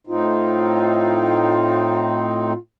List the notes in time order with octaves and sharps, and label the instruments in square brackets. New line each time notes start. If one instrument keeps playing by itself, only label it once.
[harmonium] A2 C4 D#4 [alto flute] F4